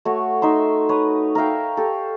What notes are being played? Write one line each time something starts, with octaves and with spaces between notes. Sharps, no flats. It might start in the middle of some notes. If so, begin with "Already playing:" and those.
A3 F#4 C#5
D#4 E5 C6
B4 C#5 D#6
A#4 E5 F5 G5
G4 A4